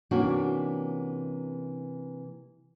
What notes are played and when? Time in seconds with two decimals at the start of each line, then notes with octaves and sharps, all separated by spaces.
0.11 C3 E3 A#3 C#4 D4 F#4